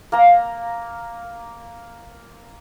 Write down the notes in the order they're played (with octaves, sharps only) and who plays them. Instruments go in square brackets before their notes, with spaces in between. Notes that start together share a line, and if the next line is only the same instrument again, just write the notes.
[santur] A#3 A#5